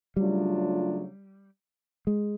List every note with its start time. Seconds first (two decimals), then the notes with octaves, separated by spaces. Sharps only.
0.17 C#3 F#3 G3 A3 D4 F4
2.07 G#3